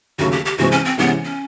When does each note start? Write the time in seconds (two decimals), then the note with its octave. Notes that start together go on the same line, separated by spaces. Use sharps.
0.18 D#2 C#3 F#3 A3 F#4
0.32 G4
0.45 G4
0.58 C3 E3 G#3 C4 F#4
0.72 C#4
0.85 C4
0.98 C3 E3 G#3 B3 C#4
1.25 C#4